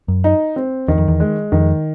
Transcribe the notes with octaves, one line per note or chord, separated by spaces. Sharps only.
F#2
D#4
C4
E2 D#3
F2
E2
G#3
F2 D#3